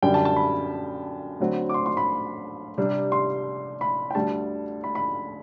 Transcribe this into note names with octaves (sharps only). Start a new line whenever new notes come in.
F#2 D3 G3 D4 G5
A5
A5
B5
D2 D3 F#3 C4
D6
C6
C6
B5
C3 G3 D4
C6
B5
G5
D2 D3 G3 A5
B5
B5